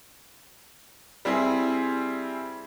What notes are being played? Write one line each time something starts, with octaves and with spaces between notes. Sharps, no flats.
G3 C4 E4 G#4